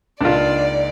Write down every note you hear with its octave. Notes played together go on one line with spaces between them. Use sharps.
C#2 A#3 D4 D#4 F4 D5